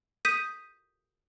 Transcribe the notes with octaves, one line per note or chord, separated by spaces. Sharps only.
D#6 G6 B6 D#7